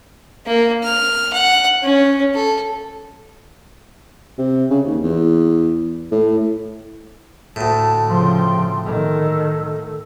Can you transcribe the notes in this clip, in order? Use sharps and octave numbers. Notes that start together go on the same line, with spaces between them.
A#3
F6
F#5
C#4
A4
C3
C#3
D#2
E2
A2
D2 A2 A5
C#3 F3 G5 C6
D#3 A4